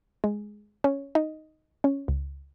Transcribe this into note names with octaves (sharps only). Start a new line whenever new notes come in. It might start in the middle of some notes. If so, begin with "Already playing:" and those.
G#3
C#4
D#4
C#4
C#2